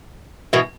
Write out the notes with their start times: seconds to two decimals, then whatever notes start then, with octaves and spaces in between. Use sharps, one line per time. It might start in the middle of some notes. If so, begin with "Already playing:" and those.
0.53 B2 E3